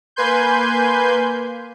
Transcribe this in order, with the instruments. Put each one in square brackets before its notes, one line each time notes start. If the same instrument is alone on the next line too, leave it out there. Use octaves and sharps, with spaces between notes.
[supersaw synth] A#3 B4 G#5 C6 G6